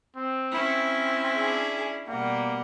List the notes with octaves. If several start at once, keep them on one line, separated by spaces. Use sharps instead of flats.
C4
C#4 E4
D4 G#4
B2 G3 A#3 F#5